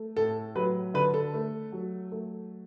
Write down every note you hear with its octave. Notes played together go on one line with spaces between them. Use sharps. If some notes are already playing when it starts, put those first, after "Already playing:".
Already playing: A3
A2 A4
F#3 B4
D3 B4
A4
A3
F#3
A3